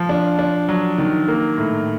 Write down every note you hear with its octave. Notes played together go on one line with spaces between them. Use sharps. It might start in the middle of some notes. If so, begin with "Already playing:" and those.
Already playing: F3
D4
D4
F#3
D#3
A#3
A2